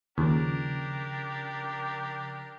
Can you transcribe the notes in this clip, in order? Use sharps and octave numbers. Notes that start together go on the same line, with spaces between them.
D#2 C#3 F3 D4 G4 A#4